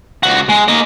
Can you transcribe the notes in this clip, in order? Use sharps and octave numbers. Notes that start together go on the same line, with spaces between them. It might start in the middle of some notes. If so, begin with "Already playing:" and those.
C#2 F#4
G#3
A#3 D#5